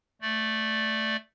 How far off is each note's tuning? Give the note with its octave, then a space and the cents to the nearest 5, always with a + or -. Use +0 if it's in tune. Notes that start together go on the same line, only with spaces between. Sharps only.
A3 +0 D5 +0